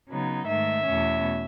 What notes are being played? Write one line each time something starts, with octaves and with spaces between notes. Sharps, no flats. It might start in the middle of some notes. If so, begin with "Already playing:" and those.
C#3 F#3 B3 D#4
G#2 D#3 A3 E5
E2 B2 A3 C#4